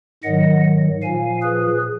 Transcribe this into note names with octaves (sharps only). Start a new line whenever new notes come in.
G#2 D#3 F#3 D#5 F#5
A#2 F3 F5 G#5
G#4 B4